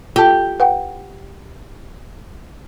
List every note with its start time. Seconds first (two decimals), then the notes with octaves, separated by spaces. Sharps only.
0.16 F4 G4 A4 A5
0.60 B4 F#5 G5